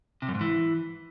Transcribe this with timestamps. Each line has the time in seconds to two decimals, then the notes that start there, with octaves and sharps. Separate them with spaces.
0.22 C3
0.28 F#2
0.35 G#2
0.41 E3